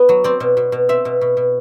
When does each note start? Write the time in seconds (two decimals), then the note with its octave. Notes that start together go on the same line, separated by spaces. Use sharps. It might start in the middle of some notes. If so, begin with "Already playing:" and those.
Already playing: B3
0.09 F#3
0.24 C4 D5
0.40 B2
0.57 B2
0.72 B2
0.89 C4 E5
1.05 B2
1.21 B2
1.37 B2